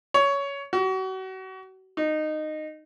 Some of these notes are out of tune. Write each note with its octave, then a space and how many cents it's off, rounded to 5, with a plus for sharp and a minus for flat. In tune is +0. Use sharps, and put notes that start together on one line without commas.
C#5 +15
F#4 +35
D#4 -15